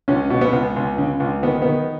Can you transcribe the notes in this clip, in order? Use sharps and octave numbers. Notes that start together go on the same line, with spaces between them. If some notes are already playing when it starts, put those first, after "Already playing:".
C#2 C#4
B2
B3
C#2
C#2
C#3
C#2
D#3 B3
D#3 B3